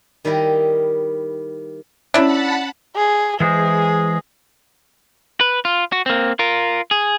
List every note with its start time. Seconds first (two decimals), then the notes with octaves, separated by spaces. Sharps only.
0.25 D#3 G3 E4 A#4 D#5
2.14 C#4 D4 E4 C#5 E5 F#5 A5 B5
2.96 G#4
3.40 E3 G#3 G#4 C5
5.41 B4
5.65 F4
5.92 F#4
6.06 A#3 C4
6.39 F4 A#4
6.91 G#4